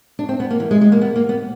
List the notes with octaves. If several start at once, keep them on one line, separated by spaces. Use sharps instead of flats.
D4
C4
B3
A#3
E3
G#3
G#3
A#3
B3
A#3
B3